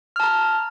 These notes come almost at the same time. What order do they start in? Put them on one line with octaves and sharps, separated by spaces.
F6 A5 A#5